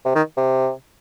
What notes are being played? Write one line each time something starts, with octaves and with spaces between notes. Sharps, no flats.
C3
D#3
C3